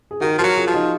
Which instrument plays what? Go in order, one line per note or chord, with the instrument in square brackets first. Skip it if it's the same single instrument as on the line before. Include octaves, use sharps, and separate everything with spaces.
[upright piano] G#4
[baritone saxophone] D#3 [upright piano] F#4 A#4
[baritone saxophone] F3 [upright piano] F#4 A#4
[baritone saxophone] F#3
[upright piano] F4 G#4
[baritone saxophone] F3
[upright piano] D#4 F#4